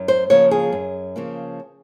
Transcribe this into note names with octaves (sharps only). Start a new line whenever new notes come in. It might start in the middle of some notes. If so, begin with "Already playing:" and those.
Already playing: F#2
C5
C#3 F3 A#3 C#5
G#4
F#2
C#3 F3 A#3